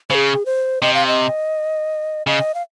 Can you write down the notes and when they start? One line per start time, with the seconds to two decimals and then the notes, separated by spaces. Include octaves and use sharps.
0.10 C#3 G#4 C5
0.46 C5
0.82 C3 D#5
0.94 F5
1.07 D#5
2.27 C#3 D#5
2.55 F5